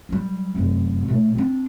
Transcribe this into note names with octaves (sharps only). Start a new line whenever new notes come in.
F#3 G3
F1 F#2
A#2 A3
C4 D4